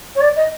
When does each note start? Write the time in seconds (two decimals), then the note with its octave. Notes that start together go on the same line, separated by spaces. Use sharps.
0.15 C#5
0.20 D5
0.36 D#5